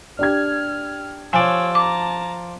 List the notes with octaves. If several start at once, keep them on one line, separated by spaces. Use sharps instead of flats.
D4 G4 F6 G#6
F3 C#5 D5 G#5 E6
A5 A#5 D6